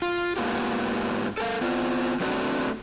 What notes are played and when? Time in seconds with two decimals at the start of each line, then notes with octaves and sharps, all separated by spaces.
0.02 F4
0.36 G#2 C3 A#3 B3 F4 G4
1.37 A4 A#4 F5
1.61 B3 C4 F4
2.20 F#3 A3 B3 C4 D4 F#4